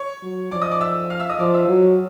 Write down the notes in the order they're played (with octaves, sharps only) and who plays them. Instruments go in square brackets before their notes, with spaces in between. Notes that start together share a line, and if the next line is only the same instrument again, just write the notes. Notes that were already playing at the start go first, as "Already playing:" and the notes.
Already playing: [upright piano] C#5 C#6
[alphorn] F#3
[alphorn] F3 [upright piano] D5 D6
[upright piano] D#5 D#6
D5 D6
E5 E6
F5 F6
E5 E6
D#5 D#6
[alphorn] F3 [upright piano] D5 D6
[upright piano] E5 E6
[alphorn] F#3